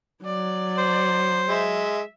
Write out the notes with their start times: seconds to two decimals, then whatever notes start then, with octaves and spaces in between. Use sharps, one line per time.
0.24 F#3 D5
0.78 C5
1.49 G#3 E5